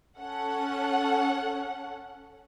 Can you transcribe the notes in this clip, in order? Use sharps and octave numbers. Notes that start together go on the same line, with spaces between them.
C#4 A4 F#5